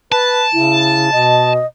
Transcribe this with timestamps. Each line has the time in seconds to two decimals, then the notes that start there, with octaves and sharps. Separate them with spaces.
0.12 B4 A5
0.53 C#3 E4
1.12 B2 D#5